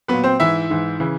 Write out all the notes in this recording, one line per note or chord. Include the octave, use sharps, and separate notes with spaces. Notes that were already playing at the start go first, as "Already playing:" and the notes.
A#2 F#3 B3 B4
C4 C5
G#2 E3 E4 E5
G#2 E3
C#3 E3